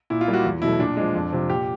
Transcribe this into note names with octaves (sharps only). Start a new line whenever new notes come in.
A#2 E4
F4
G3 A#3
F#4
E2
B2 F#3 A3 E4
A#2 D4
F3 G#3
F2
C3 F3
A#2 G4